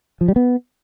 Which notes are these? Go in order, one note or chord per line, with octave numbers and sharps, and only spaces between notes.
F3
G3
B3